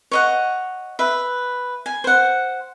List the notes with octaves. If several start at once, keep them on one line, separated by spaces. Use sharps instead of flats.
C#5 D#5 F#5
B4 E5
G#5
C5 F#5